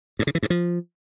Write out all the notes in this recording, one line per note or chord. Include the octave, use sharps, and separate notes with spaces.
G2
C#3
E3
G2
F3